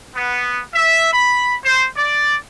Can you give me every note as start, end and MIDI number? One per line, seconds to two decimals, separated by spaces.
0.15 0.60 59
0.74 1.12 76
1.12 1.54 83
1.64 1.85 72
1.96 2.35 74